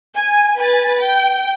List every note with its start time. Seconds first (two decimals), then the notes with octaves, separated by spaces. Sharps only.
0.15 G#5
0.57 B4 G#5 A6
0.99 G5